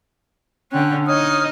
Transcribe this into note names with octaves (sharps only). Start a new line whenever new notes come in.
D3 C#4 G5 F#6
D#4 C#5 D#5 D#6 F6